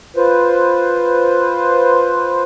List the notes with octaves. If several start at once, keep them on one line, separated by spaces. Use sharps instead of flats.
F4 B4 C5